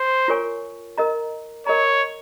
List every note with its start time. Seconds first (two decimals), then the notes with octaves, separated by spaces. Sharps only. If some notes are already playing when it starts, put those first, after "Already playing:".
Already playing: C5
0.28 F4 A#4 C#5 G#5 C#6
0.98 A#4 D#5 A#5
1.66 A#4 C#5 D#5 A#5